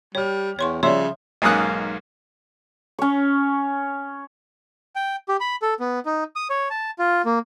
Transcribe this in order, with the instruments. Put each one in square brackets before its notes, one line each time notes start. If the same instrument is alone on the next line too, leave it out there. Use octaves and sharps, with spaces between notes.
[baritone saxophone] G3 [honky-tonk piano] G4 F6 [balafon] C#5
[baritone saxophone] E2 [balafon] C#5 C6 C#6
[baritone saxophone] C#3 [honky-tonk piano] F3 G3 [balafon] C#5 [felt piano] E5 C6
[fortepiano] B1 G#2 A#3 C#4 D#6 F#6
[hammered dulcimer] C#4 C#5
[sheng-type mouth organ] G5
G4
B5
A4
B3
D#4
D#6
C#5
A5
F4
A#3